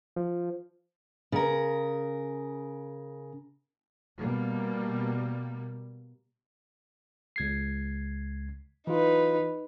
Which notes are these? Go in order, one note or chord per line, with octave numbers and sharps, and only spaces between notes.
F3
C#3 A#4
B2 G3 A#3
C#2 G#6 C7
E3 D#4 F4 B4